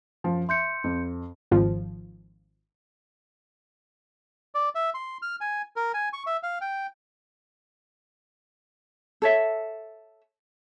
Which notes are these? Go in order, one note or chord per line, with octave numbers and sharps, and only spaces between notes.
F#2 F3
E5 C6 G6 C#7
F2
G#1 F3
D5
E5
C6
F6
G#5
A#4
G#5
C#6
E5
F5
G5
A4 C#5 E5